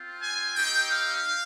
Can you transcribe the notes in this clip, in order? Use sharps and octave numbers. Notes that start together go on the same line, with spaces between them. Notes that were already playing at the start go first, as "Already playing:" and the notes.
Already playing: C4 F4
G#5
C4 D#4 G4 G5
F5